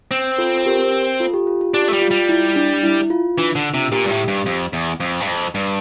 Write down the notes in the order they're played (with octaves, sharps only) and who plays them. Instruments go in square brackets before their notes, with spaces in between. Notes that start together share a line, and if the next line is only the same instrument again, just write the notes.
[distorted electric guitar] C4
[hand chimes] F4 A4
G4 A#4
F4 A4
G4
F4
F4
[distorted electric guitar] D4 [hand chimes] G4
[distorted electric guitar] A3
G3
[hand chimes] F4
[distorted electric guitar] G3
[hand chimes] E4
D4
E4
F4
[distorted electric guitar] E3 [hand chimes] D4
[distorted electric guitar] D3 [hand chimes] D4
[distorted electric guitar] C3 [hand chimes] F4
[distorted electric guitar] A#2 [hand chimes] G4
[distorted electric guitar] G2
A2
G2
F2
E2
F2
G2
F2
G2